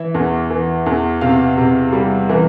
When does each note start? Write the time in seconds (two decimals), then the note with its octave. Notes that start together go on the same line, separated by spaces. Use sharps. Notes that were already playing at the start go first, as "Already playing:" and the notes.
Already playing: E3 E5
0.15 E2
0.50 E3
0.86 E2
1.21 C3 F5
1.58 C3
1.93 G3
2.29 E3